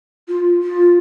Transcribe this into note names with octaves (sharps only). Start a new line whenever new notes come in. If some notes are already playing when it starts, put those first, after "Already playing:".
F4
F4